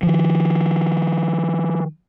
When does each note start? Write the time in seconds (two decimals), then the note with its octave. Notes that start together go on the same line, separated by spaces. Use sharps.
0.03 D#3 F3